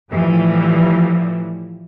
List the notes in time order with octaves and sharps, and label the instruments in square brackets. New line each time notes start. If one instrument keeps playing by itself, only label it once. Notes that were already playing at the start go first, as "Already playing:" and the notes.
[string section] A2 E3 F3 G3